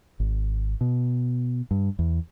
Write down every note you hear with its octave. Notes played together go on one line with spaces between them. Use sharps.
G#1
B2
G2
E2